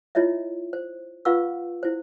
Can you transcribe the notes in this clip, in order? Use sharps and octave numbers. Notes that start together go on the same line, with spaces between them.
E4 F4 C#5 D#5 E5
C5
F4 B4 F5 F#5 C#6 E6
E4 C5